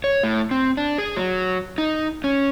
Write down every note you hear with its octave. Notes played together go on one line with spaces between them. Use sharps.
C#5
A2
C4
D4
G#4
F#3
D#4
C#4